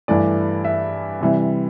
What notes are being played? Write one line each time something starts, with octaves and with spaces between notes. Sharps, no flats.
G2 E3 A3 D5
E5
C3 E3 G3